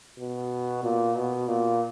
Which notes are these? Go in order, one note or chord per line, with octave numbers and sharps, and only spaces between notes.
B2
A#2
B2
A#2